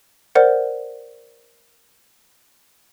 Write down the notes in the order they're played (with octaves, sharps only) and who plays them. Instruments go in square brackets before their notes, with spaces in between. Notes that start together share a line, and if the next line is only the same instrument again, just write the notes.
[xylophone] A#4 C5 D5 F#5